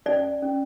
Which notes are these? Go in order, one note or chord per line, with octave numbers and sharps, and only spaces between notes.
C#4 D5
C#4